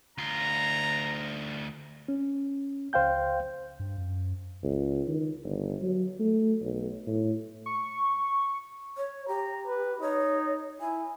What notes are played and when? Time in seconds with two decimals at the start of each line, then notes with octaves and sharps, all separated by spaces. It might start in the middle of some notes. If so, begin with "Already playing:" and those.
0.18 D2 F4 A#5
2.08 C#4
2.93 C#2 C5 F5 G5 G6
3.79 G2
3.98 F#2
4.63 C#2
5.08 D#3
5.44 G1
5.82 F#3
6.20 A3
6.61 B1
7.06 A2
7.66 C#6
8.97 C#5
9.28 G4 A#5
9.66 B4
10.01 D#4 C#5
10.81 E4 G#5